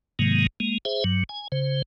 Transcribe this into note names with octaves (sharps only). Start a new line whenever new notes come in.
G#2 C3 D#3 F#3 G#3 A#3
G#3 A#3
G#4 C5 E5
G2 F#3
G#5
C#3 C5